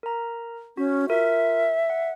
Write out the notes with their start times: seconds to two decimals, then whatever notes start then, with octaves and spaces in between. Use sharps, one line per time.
0.03 A#4 A#5
0.77 C#4 F#4
1.09 F4 A#4 E5
1.90 F#5